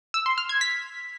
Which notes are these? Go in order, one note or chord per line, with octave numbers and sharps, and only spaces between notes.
E6
C6
F6
G#6
B6